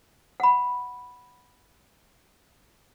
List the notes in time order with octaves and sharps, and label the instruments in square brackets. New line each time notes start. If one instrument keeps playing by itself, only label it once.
[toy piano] F#5 B5